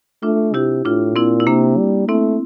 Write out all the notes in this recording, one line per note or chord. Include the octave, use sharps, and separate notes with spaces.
A3 D4 F4
C3 E4 G4
A2 D4 F4
A#2 C4 E4
E4
C3 A#3 D4
G3
A3 C4 E4